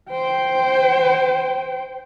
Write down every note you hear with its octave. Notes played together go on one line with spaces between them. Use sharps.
C5 G5